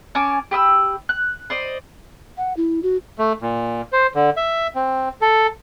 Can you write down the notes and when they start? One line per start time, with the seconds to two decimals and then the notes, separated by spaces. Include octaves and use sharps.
0.15 C#4 G#5 A5 D6
0.51 G4 B5 D#6 E6
1.09 F#6
1.50 C5 D5 D#5
2.38 F#5
2.57 E4
2.83 F#4
3.19 A3
3.42 A#2
3.93 C5
4.15 D3
4.37 E5
4.75 C4
5.21 A4